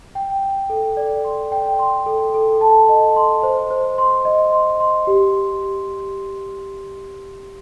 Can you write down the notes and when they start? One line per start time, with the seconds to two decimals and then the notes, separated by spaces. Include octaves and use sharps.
0.15 G5
0.43 G5
0.70 A4
0.97 D5
1.24 C6
1.52 G5
1.79 C6
2.06 A4
2.34 A4
2.61 A5
2.89 D#5
3.16 C6
3.43 C5
3.71 C5
3.98 C6
4.25 D#5
4.52 C6
4.80 C6
5.07 G4